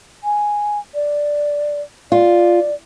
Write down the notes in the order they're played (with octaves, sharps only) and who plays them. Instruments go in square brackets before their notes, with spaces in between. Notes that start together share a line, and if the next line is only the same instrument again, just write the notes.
[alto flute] G#5
D5
[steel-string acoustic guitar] F4 [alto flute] D5